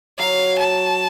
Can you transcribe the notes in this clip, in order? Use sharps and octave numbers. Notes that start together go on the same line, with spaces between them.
F#3 F5
A5